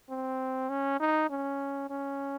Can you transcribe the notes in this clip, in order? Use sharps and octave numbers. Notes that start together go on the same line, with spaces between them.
C4
C#4
D#4
C#4
C#4